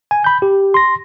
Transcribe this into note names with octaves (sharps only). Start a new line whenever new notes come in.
G#5
B5 G6
G4
C6 A#6